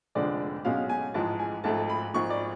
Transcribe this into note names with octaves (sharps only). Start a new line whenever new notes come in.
F1 F2 D3 G#3 D4 D5
B1 B2 G#3 C#4 F5
G#5
A1 G#2 F3 G#3 A5
G#5
G#1 G#2 F3 A3 A5
B5
G#1 G#2 F3 C#6
D5